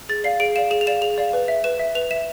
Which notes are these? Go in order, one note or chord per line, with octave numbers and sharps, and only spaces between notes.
G#4 A6
D5 F5 C7
G#4 D7
D5 F5 E7
G#4 E7
F7
D5 F5 E7
G#4 F7
D5 F5
B4
E5
B4 E7
E5
B4 F7
E5 E7